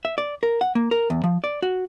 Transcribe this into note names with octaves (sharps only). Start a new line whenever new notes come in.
E5
D5
A#4
F#5
A#3
A#4
E2
F3
D5
F#4